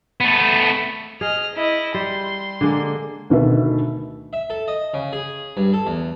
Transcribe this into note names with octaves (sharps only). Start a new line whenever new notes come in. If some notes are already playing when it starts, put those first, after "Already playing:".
A3 B3
G#4 D#5 F6
E4 D#5
G3 C6
D3 G#3 A#3
D2 B2 D3 D#3 B4 E5
E5
A4
D#5
C#3
G#4
G2
A4
E2